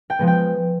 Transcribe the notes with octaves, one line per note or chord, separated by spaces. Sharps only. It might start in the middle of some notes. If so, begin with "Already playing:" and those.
G5
F3 G#3 B3
G5